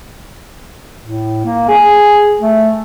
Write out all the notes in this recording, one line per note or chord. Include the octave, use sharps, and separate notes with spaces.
A2
A#3
G#4
A3